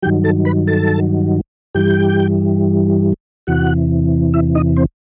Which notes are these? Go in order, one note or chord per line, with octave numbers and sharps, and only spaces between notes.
G2 D#3 F#3 G4 G5
A4 A5
B4 B5
A4 A5
G2 E3 G3 G4 G5
E2 C3 E3 F#4 F#5
E4 E5
D#4 D#5
C4 C5